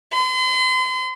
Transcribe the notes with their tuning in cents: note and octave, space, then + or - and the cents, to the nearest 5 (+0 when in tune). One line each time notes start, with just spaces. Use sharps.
C6 -40